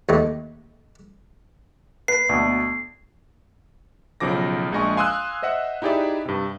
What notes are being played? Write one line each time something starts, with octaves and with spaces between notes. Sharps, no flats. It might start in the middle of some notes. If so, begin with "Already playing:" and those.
D#2 A3 D#5
B4 C7
D2 B2
B1 C#3 F3 D6 A#6
A#1 G#3 D4 D#5 G#5 C#6
F5 G#5 C6 D#6 E6 F#6
C5 D#5 E5 F#5
D#4 E4 G4 G#4 D5 E5
G2 C3